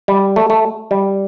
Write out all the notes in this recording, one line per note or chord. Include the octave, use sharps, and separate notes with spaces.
G3
A3
A3
G3